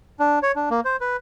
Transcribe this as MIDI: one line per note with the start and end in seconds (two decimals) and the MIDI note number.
0.19 0.39 62
0.42 0.52 73
0.56 0.69 62
0.70 0.80 58
0.85 0.96 72
1.01 1.17 71